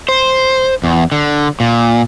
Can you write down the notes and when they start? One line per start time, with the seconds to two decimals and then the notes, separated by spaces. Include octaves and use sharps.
0.09 C5
0.84 E2
1.12 D3
1.60 A#2